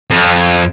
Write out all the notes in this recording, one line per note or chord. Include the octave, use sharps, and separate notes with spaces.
F2